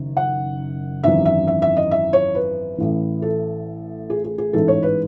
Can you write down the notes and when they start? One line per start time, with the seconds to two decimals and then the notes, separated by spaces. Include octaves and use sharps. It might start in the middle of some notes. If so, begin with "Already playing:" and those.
Already playing: F#1 F#2 D#3
0.17 F#5
1.03 G#1 F#2 E3 E5
1.25 E5
1.47 E5
1.62 E5
1.77 D#5
1.91 E5
2.13 C#5
2.35 B4
2.78 A1 A2 E3
3.22 A4
4.10 G#4
4.24 G#4
4.38 G#4
4.53 A1 G#2 E3 A4
4.68 C#5
4.83 B4